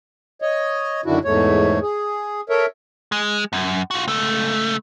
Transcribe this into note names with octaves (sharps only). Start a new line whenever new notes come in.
C#5 D#5
F#2 D3 D#3 D4 E4 F#4
E2 G#2 A3 C#5
G#4
A4 A#4 C#5 E5
G#3
F#2
F4 F#4
C#2 A3